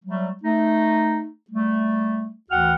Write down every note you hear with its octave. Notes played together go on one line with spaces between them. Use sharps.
F#3 G3 A3
A3 D#4
G3 A3
D2 E3 F#4 F#5 G5 F6